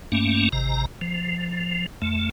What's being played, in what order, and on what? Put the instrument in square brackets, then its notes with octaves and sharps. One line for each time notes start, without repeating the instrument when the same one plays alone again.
[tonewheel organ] G2 A3 A#3 C#4
G#1 C3 A#5
F3
F2 A3